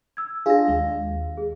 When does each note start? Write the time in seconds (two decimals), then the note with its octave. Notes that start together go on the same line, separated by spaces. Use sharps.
0.17 E6 G#6
0.46 D4 F4 G#4 F5 A#6
0.68 D#2 G#3
1.37 G#4